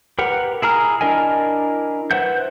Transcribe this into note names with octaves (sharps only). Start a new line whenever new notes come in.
G4 A#4 B4 F#5
E4 G#4 A#5 F6
D4 E4 A#4 D#5 G#5
B4 C5 E5 F#5 G6